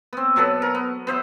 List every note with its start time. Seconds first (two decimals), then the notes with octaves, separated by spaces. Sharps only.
0.13 B3 C4
0.36 B2 F#3 A4 B4
0.62 A#4
0.75 B3
1.07 B3 C5 E5